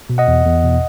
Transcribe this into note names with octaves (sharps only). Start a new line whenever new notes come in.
B2
D#5 F#5
E2
E2
B2